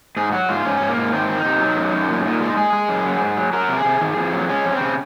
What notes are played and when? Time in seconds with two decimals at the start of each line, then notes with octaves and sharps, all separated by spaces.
0.17 G#2 G#4
0.32 F#3 F#4
0.49 G#2 F4
0.65 G#2 C#4
0.81 G#2
0.88 A#3
0.97 G#2
1.13 D#3 C4
1.29 D#3
1.37 D#4
1.45 C3
1.61 F#3
1.77 F#2
1.93 F#2
2.09 A#2
2.25 A#2
2.41 G#3
2.57 G#3 G#4
2.73 G#3
2.89 F#2
3.05 F#3
3.21 G#2
3.37 F#3
3.53 F#3 A#4
3.69 C3
3.77 G#4
3.85 C3
4.01 D#3
4.17 F2
4.33 F#3
4.49 G#3 C#4
4.65 F2
4.73 C4
4.81 C#3